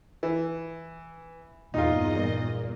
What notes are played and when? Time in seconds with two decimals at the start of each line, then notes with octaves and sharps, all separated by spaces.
0.23 E3
1.74 E2 G2 A#2 D#4 F4 D#5